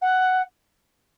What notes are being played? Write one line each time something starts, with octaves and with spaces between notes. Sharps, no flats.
F#5